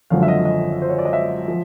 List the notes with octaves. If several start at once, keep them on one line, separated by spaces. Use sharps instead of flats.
G#1 F#2 D3 F3 F5
E5
D#5
D#5
C5
C#5
D5
D#5
E5
F3